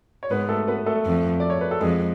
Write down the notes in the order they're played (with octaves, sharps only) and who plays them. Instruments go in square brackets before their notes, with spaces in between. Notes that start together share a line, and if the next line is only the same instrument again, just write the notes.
[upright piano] C#5
[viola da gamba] G#2 [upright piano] B3 B4
[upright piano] A3 A4
B3 B4
A3 A4
[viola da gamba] F2
[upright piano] D5
C#5
B4
A4
[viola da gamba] F2 [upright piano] G#3 G#4